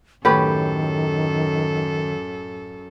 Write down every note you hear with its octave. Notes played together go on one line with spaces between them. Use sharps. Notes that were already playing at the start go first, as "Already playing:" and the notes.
F#2 A2 D#3 G4 A4 B4